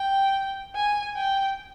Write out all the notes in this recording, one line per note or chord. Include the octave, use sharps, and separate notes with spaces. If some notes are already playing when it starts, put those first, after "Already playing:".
Already playing: G5
G#5
G5